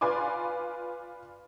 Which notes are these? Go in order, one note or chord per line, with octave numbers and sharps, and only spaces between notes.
F4 B4 D5 G#5 C6 D6